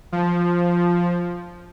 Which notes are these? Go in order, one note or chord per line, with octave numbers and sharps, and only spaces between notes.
F3